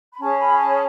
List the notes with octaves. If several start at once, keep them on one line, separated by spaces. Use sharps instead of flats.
B5
C#4 G#4 C#5 A5
B5
A5